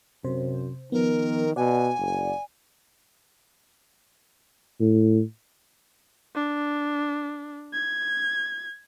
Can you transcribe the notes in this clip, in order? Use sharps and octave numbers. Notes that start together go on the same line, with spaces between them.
F#2 C3 C5
D#3 F3 B3 A#4
B2 D5 F#5 G#5
F#1
A2
D4
G#6